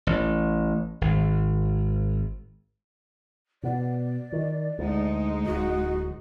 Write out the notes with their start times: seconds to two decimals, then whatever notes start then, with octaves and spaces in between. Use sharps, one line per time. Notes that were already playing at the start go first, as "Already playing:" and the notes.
0.07 A1
1.01 G#1
3.63 B2 B3 D5
4.32 D#3
4.79 D2 G#3 D#4
5.46 D1 F#4